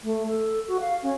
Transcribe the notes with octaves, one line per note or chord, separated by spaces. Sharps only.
A3
A4
F#4
F5
C#4